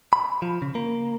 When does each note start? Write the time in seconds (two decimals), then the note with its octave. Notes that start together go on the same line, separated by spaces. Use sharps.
0.13 B5
0.42 F3
0.62 C#3
0.75 A#3